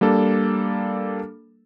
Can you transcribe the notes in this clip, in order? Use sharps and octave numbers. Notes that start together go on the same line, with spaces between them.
G3 A#3 D4 A4